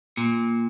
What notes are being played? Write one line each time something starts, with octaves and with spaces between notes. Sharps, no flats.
A#2